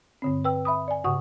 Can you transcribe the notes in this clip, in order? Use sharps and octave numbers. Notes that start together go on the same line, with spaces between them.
G2 D3 C4
B4 G5 E6
E5 B5 D#6
D5 G#5
G#2 C#3 F#4 F#5 C#6 D#6